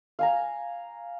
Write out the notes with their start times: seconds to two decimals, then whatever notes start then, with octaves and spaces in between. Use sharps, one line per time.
0.19 F5 G#5 A#5